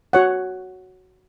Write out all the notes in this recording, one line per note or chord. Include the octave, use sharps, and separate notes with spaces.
F#4 C#5 F#5